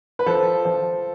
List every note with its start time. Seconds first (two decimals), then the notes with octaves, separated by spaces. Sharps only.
0.19 B4
0.26 F3 A4
0.65 F3